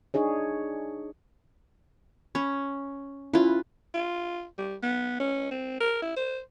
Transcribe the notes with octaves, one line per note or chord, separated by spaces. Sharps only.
D4 D#4 G#4 C#5
C#4 B5
C#4 E4 F4 B4
F4
G3
B3
C#4
C4
A#4
E4
C5